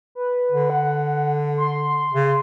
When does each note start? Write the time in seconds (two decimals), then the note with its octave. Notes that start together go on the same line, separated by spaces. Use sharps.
0.15 B4
0.52 D3
0.70 F#5
1.57 C6
2.13 C#3